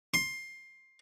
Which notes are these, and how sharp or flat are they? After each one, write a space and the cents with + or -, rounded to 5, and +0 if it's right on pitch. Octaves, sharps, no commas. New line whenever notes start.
C6 +15